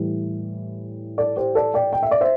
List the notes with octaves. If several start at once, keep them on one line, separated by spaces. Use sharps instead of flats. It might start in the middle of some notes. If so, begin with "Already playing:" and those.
Already playing: A2 E3 G3
A4 D5
G4 C5
A4 D5
D5 G5
G5
E5
D5
C5 E5